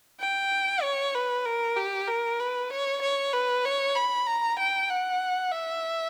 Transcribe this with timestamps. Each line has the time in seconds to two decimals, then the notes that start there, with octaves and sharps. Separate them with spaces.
0.20 G5
0.83 C#5
1.14 B4
1.45 A#4
1.77 G4
2.08 A#4
2.40 B4
2.71 C#5
3.02 C#5
3.33 B4
3.65 C#5
3.95 B5
4.27 A#5
4.59 G5
4.90 F#5
5.52 E5